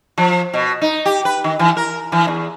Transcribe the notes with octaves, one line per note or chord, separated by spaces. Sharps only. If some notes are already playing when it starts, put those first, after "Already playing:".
F3
B2
D#4
G4
B4
D#3
E3
A#4
E3
E2